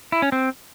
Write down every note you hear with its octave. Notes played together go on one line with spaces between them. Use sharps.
E4
C#4
C4